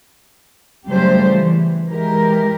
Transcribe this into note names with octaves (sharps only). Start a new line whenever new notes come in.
C#3 F#3 G3 A3 G4 C5
E3
E3 G#3 G4 A#4